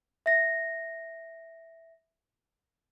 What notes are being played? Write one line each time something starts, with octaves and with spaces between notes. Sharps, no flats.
E5 A#6